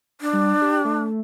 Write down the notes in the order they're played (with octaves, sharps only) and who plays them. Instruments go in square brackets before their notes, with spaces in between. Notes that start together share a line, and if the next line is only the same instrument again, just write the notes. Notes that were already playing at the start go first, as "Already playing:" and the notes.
[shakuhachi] D4
[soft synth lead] G3
G4
A3